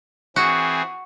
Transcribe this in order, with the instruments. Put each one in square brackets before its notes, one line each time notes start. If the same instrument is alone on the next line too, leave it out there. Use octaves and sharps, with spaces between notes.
[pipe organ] E3 C4 G#4 [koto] F#4